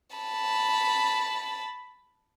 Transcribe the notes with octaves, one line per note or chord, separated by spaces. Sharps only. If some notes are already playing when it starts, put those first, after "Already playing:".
A5 B5